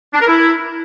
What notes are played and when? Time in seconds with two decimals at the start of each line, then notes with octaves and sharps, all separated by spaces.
0.13 D4
0.21 A#4
0.28 E4